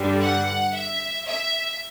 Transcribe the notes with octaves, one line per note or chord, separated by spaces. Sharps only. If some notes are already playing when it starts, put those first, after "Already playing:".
Already playing: G2 D3 G3
F#5
E5
E5